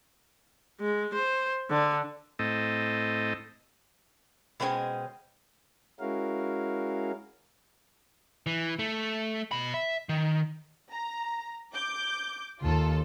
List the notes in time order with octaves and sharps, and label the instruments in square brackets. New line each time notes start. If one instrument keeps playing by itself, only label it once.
[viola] G#3
C5
D3
[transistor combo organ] A2 C4 A4 D#5
[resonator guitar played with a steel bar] B2 G#3 C4 C#4 G#4
[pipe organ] G#3 C#4 E4 F#4 A#4 F5
[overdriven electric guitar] E3
A3
B2 B5
E5
D#3
[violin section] A#5
D6 G6
[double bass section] D#2 [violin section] F4 A4